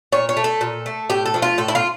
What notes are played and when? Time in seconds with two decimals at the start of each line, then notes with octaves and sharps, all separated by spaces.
0.12 A#2 C#5
0.29 C#5
0.37 A3
0.44 A4
0.61 A#2
0.86 A3
1.10 A2 G4
1.26 A4
1.34 F3 A3
1.42 F4
1.58 A2 A4
1.68 E4
1.75 F4